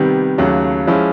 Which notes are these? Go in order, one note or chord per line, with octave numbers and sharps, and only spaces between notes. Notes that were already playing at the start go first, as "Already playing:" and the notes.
Already playing: C3 D#3 G3 B3
D#2 C#3 F#3 A3
F3 G#3 C#4 E4